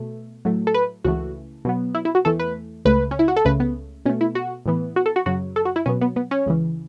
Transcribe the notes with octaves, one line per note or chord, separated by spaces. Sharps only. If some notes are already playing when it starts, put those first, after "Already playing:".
Already playing: B2 A3
A2 F#3 A3
A4
B4
C#2 C#3 E3 A3 F#4
B2 F#3 B3
E4
E4
F#4
E2 E3 A3 A4
B4
C#2 C#3 A3 B4
C#4
E4
F#4
A4
C#2 C#3 A3 B4
B3
B2 A3 C#4
E4
F#4
A2 E3 B3
F#4
A4
F#4
F#2 C#3 F#3 F#4
A4
F#4
E4
B2 F#3 B3 C#4
B3
B3
C#4
C#2 C#3 E3